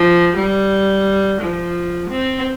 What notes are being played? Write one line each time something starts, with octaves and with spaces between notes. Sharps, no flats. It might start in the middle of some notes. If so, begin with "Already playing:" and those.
Already playing: F3
G3
F3
C4